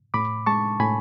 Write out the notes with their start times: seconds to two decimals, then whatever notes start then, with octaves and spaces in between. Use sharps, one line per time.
0.14 A2 B5 D6
0.46 G#3 A5 C#6
0.80 A2 G#5 B5